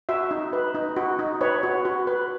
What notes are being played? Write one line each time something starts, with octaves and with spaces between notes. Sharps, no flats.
F#4 E5
D#4
B4
D#4
F#4
D#4
B4 C#5
F#4
F#4
B4